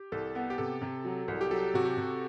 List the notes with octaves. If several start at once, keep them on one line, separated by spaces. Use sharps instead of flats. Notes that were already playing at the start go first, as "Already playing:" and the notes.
Already playing: G4
C2 A4
B3
G4
C3 A4
C3
F#3
C2
G4
F#3 A4
C3 F#4
G4
C3